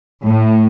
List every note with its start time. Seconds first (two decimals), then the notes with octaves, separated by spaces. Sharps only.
0.22 A2